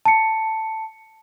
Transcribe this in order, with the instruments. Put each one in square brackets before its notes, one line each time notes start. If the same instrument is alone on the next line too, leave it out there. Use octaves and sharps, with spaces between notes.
[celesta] A5 C#7